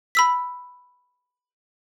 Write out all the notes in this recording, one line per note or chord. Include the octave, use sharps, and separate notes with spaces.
B5 E6 B6